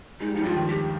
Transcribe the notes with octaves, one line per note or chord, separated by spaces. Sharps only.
G#3 D#4
G3
F3 D#4
G2 G3 F4
F3
D#2 D#3
G4